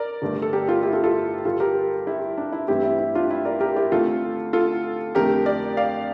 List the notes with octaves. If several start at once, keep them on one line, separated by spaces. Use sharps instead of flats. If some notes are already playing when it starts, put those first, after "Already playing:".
Already playing: A#4 D5
G1 G2 D3 A3
A4
G4 A#4
F4 A4
E4 G4
F4 A4
F4 A4
G2 D3 G3 F4 A4
G4 A#4
E4 G4
D4
E4
G2 E3 A3 C4 E4 G4
E4
E4
D4 F4
E4
A#4 D5
G4 A#4
E4 G4
D2 D3 A3 C4 F4 A4
F4 A4
F2 D3 A3 G4 A#4
A#4 D5
D5 F5